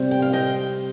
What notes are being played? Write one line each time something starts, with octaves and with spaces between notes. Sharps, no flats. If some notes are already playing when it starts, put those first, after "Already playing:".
Already playing: C3 G3 C4
G5
F5
D#5 G5